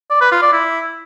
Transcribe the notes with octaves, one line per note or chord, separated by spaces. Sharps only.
D5
B4
F4
D5
E4